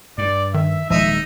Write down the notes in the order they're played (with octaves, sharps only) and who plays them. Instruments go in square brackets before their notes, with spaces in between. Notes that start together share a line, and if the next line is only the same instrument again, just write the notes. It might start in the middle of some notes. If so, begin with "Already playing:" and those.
[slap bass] G2 [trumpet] D5
[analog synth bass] D#3 [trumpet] E5
[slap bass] D#1 G#3 [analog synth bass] F3 [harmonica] D#4 [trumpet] E5